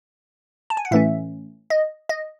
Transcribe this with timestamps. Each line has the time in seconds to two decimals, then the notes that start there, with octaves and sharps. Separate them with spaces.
0.70 A5
0.77 G#5
0.85 F#5
0.91 A2 E3 A3 C#4 E5
1.70 D#5
2.09 D#5